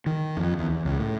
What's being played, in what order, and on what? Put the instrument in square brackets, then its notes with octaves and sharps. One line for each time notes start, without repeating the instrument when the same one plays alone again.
[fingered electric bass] D#3
F2
E2
E2
C#2
A2